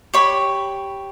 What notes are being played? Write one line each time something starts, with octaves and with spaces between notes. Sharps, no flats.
G4 C#5 B5